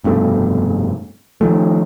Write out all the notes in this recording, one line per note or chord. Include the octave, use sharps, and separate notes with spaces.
F1 G2 B2 A3
D#3 F3 A3